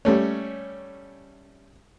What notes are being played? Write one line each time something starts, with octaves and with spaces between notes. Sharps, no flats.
G3 A3 C#4